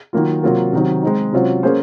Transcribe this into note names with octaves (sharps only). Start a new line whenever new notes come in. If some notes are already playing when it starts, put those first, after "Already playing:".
D#3 F#3 A#3 F4
C3 F#3 A#3 F4 A#4
C3 D#3 F#3
G#3 C4 D#4
C3 F#3 C#4 F4 C5
A#3 C#4 G#4 C5